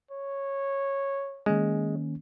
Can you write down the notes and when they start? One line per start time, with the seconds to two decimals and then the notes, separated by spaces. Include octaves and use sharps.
0.11 C#5
1.46 D#3 G#3 A#3 C#4